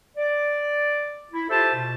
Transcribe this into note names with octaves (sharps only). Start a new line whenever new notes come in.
D5
E4
F4 G4 A4 C5 E5 A5
B2